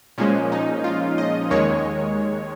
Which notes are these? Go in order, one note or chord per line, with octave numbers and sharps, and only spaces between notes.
A#2 F3 G#3 C#4
D#4
F4
D#5
D#2 D#3 G#3 C#5